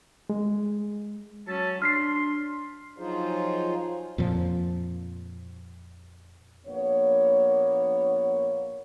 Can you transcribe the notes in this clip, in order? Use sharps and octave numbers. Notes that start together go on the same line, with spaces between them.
G#3
F#3 C#4 E5 A5
D4 C6 F6 B6 C7
F3 F#3 D#4 F4 G#4 C5
F2 A#2 F3
A#1 A#3 B3 C#5